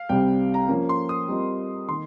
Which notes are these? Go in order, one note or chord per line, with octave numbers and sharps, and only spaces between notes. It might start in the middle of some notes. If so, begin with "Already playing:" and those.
Already playing: F5
C2 C3 G3 C4 G5
A#5
F3 A#3 C#4
C6
D#6
G3 C4 F4 A#4 D#5
D#3 A#3 C6